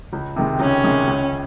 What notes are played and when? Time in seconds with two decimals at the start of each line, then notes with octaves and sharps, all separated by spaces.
0.13 C#2
0.36 C3 D#3 G#3
0.60 C#2 C#4
0.84 C3 D#3 G#3
1.07 C#2